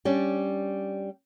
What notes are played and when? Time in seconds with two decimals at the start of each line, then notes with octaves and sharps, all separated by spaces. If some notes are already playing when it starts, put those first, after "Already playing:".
0.05 G3 C#4 D4